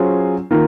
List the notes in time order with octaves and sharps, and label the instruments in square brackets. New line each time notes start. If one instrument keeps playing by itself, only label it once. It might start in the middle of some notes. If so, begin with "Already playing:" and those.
Already playing: [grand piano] F#3 C#4 F4 G#4 C5
D#3 A#3 F4 A#4